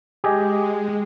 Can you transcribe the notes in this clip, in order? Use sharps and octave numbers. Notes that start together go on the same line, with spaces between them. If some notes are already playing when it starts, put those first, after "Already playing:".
G#3 G4 G#4 D#5